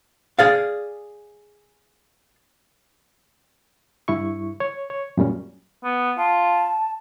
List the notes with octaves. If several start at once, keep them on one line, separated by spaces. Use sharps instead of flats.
G#4 D5 F5
G2 E4 C#6
C#5
C#5
F#2 A#2 G3 C#4
B3
F4 A5